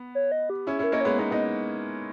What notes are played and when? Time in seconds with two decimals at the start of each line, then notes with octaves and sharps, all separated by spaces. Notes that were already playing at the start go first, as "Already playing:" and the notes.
Already playing: B3
0.15 C#5
0.32 D#5
0.50 G4
0.67 C#4 E4 G#4
0.79 C#4 E4 A#4
0.92 A#3 C#4 D#5
1.01 G#3 B3 C#5
1.18 B3 D#4 B4
1.31 B3 D#4 D#5